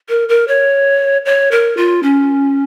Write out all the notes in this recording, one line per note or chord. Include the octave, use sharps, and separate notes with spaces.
A#4
A#4
C#5
C#5
A#4
F4
C#4